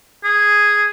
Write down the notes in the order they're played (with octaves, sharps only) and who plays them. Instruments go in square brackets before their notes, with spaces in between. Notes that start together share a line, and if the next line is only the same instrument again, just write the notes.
[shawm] G#4